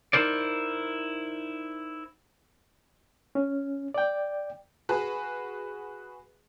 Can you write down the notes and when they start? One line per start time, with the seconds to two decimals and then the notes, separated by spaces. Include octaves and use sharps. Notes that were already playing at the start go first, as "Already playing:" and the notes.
0.13 D#4 E4 A#4 C5 D5
3.35 C#4
3.94 D5 G5
4.89 F#4 G#4 B4